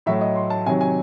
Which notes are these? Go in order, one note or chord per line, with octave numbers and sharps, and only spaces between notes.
A2 F#3 A3 E5
D#5
C6
A5
C3 D#3 F#3 G#5
G#5